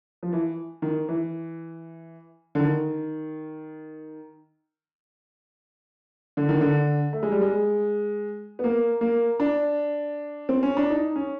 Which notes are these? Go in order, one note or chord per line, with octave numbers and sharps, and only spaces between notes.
F3
E3
D#3
E3
D3
D#3
D3
D#3
D3
A3
G#3
G3
G#3
B3
A#3
A#3
D4
C4
C#4
D4
D#4
C#4